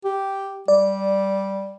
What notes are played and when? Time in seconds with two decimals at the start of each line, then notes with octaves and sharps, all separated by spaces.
0.04 G4
0.68 G3 D5